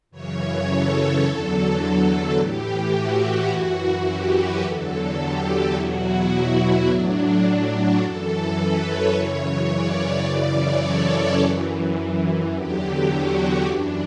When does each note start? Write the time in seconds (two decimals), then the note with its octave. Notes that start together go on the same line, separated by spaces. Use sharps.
0.11 F#2 C#3 E3 C#5
0.39 C#5
0.67 A4
0.95 A4
1.24 E2 D3 F#3
2.36 A2 E3 G4
2.93 F#4
3.49 F#2 E3 F#4
4.05 G4
4.34 B4
4.62 E2 D3 F#3 A4
4.91 A4
5.19 G4
5.74 E2 B2 F#3 F#4
6.03 E4
6.88 A2 F#3 D4
7.45 D4
7.73 F#4
8.00 F#2 E3 A4
8.57 B4
8.85 C#5
9.13 F#2 C#3 E3 C#5
9.42 C#5
9.70 D5
9.98 D5
10.26 F#2 C#3 E3 D5
10.55 C#5
10.83 A4
11.39 F#2 E3
12.52 E2 D3 F#3 G4
13.08 F#4
13.65 F#2 E3 D4